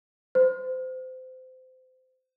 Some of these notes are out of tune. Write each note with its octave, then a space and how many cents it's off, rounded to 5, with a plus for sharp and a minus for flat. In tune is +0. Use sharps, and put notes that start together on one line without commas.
C5 -25